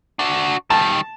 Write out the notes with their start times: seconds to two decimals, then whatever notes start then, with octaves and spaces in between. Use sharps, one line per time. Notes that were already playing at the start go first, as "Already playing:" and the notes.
0.19 D4 F#4
0.70 D#3 G3 A5